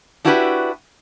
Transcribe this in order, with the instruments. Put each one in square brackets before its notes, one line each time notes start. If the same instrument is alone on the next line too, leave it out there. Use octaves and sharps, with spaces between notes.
[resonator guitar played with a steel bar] D4 E4 F#4 G4 A4 B4